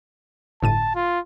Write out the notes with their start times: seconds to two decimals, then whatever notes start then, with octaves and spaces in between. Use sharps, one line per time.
0.63 G1 A2 A5 D#7
0.95 F4